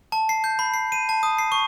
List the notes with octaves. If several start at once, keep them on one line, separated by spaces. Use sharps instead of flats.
A5
C7
G6
B5
C7
D#7
A5
D#6
C7
C#6